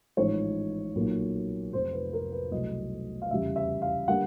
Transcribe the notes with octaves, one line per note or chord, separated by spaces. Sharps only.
A1 G#2 F3 G#3 C#5
B1 A#2 F#3 A#3
F1 F2 C3 F3 C5
B4
A#4
B4
C2 B2 F#3 A3 D#5
F5
F1 E2 C#3 E3 G3 E5
E5
F5
D3 G3 A#3 F#5